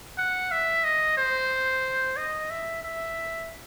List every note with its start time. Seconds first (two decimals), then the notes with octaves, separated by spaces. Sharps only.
0.18 F#5
0.51 E5
0.84 D#5
1.17 C5
2.16 D#5
2.50 E5
2.83 E5